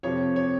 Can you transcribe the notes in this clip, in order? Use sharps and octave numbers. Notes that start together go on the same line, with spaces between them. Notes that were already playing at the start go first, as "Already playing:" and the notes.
F2 C3 F3 C#5
C#5